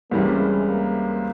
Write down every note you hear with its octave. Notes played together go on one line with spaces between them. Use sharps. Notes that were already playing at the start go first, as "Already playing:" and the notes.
C#2 C3 E3 G3 A#3 C#4
G#3
A#3